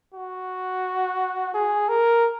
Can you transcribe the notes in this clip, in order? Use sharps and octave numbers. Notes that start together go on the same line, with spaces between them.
F#4
G#4
A#4